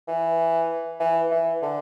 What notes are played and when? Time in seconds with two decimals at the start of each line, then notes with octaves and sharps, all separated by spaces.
0.08 E3
1.00 E3
1.31 E3
1.62 D3